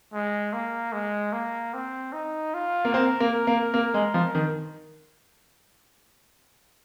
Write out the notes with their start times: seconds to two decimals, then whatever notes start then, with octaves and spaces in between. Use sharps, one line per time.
0.13 G#3
0.53 A#3
0.93 G#3
1.33 A#3
1.74 C4
2.13 D#4
2.54 F4
2.85 A#3
2.93 C4 A#4
3.20 A#3
3.47 A#3
3.74 A#3
3.94 G#3
4.14 F3
4.35 D#3